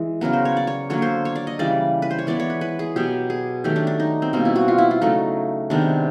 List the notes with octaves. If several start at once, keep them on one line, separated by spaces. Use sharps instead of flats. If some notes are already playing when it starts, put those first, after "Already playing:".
Already playing: E3 G#3
C#3 F#3 B3 A#4
C5
C#5
D5
C#5
D3 F#3 A#3 C#5
C5
C#5
D5
D#5
C#3 E3 G3 D5
B4
C5
C#5
E3 G#3 B3 D5
C#5
B4
B4
G#4
B2 F#3 B3 G4
G#4
D#3 F#3 A3 G4
D4
D4
D#4
C4
B2 G3 A#3 C4
E4
F#4
F4
E4
F4
C#3 F#3 A3 D#4
C3 D#3 G#3 B3 D4